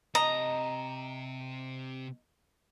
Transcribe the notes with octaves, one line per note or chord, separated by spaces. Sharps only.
C3 D#5 A5 A#5